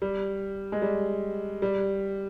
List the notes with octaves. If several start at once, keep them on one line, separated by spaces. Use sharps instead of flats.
G3
G#3
G3
G3